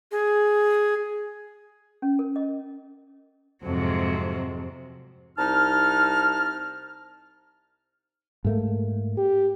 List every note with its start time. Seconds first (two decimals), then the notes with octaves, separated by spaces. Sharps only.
0.12 G#4
2.02 C#4
2.19 A#4
2.36 D#5
3.64 F2 G#2 C3 F#3
5.38 C2 D#4 A5 F6
8.44 G#2 A3 A#3
9.17 G4